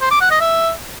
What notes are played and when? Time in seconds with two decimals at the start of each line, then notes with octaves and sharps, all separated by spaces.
0.01 C5
0.11 D6
0.21 F#5
0.31 D#5
0.41 E5